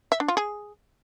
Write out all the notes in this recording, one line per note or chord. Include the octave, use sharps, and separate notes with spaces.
E5
D4
F4
G#4